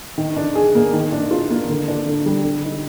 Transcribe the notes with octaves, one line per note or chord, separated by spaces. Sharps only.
D#3
D4
G#4
A#3
D#3
D4
F4
A#3
D3
D4
D3
G3
D3
D#4